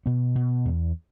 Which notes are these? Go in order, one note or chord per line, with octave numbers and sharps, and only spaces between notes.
B2 B3
B2
E2